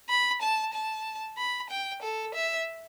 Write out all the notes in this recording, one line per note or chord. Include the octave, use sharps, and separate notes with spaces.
B5
A5
A5
B5
G5
A4
E5